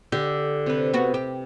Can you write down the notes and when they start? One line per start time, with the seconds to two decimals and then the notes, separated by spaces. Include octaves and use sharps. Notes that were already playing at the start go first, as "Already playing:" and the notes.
0.12 D3 G4
0.66 C3 B4
0.94 B3 F#4
1.14 G4